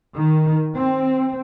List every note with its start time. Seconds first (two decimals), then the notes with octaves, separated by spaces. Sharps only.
0.16 D#3
0.74 C4